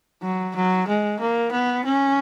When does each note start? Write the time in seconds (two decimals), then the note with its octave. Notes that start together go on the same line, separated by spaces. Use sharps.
0.23 F#3
0.56 F#3
0.88 G#3
1.20 A#3
1.52 B3
1.85 C#4